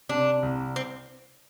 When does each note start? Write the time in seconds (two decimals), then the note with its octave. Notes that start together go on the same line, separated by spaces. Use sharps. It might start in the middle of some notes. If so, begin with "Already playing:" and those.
0.09 C3 D4
0.42 C2
0.76 C4